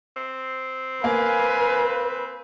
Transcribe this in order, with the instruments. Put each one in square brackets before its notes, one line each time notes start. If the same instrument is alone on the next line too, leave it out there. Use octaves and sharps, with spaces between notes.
[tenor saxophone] C4
[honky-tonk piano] A#3 [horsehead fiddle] B4 [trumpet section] F5 G#5